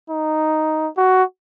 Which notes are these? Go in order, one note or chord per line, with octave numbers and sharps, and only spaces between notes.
D#4
F#4